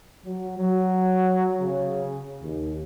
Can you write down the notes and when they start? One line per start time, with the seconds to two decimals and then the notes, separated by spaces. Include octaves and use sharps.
0.24 F#3
0.58 F#3
1.61 C#3
2.42 D#2